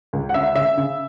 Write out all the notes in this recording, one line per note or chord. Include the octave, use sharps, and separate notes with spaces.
C#2
F#5
C#3 E5
C#3 E5
C#3